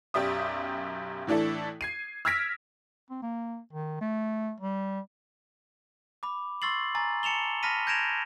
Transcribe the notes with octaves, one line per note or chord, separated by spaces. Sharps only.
B1 F#2 G4 D5 E5 D#6
A2 E3 D4 E4 A4
G#6 C7 D#7
E6 F6 G#6 A#6 B6 D7
C4
A#3
D#3
A3
G3
B5 D6
C6 C#6 E6 A6 C7 F#7
G#5 A#5 A6
A5 C#7 E7 F7 G7
A5 B5 F6 A#6 B6 D#7
G6 G#6 A#6 D7 E7 F7